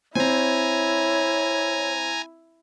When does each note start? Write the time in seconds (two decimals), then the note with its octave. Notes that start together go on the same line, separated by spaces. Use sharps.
0.15 C4 E4 C#5 G#5 A#5